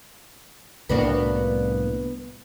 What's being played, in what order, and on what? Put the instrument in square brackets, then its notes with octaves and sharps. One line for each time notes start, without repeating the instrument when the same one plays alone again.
[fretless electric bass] C2 A2 A#3 [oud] B3 D4 F#4